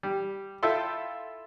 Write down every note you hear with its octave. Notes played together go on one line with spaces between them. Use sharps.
G3
E4 F4 A4 E5 G5 C6